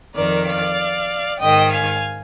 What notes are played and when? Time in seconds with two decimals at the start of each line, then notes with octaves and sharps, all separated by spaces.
0.15 F2 D#3 A#4 D5
0.47 D5 F5
1.40 G#2 D#3 D#5 G5
1.72 F5 G#5